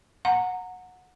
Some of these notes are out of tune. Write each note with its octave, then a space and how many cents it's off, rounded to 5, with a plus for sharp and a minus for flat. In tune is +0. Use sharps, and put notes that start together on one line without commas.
F#5 -15 A#5 -20